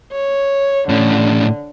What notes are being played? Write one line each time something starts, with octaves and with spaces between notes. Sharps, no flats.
C#5
A2 D3 C#4